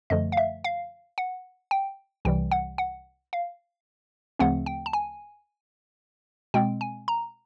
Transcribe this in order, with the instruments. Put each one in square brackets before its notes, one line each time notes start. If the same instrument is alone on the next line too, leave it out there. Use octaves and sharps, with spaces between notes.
[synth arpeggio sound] F#2 D3 F3 A3 D#5
F5
E5
F5
F#5
G5
C2 C3 E3 G3 G5
F#5
F#5
F5
D2 C#3 F3 A3 C4 F#5
G5
A5
G#5
B2 G#3 C4 G5
G#5
A#5